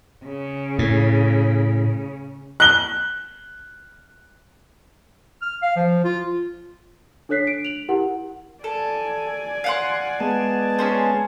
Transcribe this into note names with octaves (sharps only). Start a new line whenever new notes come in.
C#3
A2
F#6 G7
F6
F5
F3
F4
D4 A4 C#5 F#6 B6 C7
D7
F7 F#7
E4 G4 A#4 F#5
A4 D5 G#5
F5 F#5 C6
G#3 B3 A5
C#4 G#4 C5